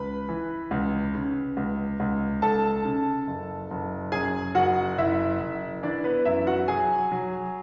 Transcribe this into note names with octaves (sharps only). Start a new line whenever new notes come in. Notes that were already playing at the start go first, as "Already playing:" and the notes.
Already playing: C#2 B4 B5
E3
C#2
C#3
C#2
C#2
C#2 A4 A5
C#3
F#1
F#1
F#2 G#4 G#5
F#1 F#4 F#5
F#1 E4 E5
F#1
E3 D4 D5
B3 B4
F#2 E4 E5
F#4 F#5
F#3 G#4 G#5
F#3